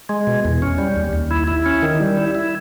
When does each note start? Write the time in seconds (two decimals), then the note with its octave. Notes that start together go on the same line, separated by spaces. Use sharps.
0.09 G#3
0.27 B2
0.45 E2
0.62 C#4
0.78 G3
0.96 D#2
1.13 D#2
1.31 E4
1.48 E4
1.66 C#4
1.83 D#3
2.00 G3
2.17 E4
2.35 E4